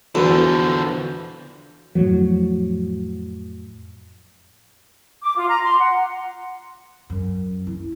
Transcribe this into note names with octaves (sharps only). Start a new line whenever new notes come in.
E2 D3 F3 F#4 A4 B4
F2 A2 F3 F#3
D6
F4
A#5
C6
F#5
F#2
E4